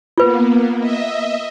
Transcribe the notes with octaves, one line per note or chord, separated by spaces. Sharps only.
A#3 B3 F4 B4
D#5 E5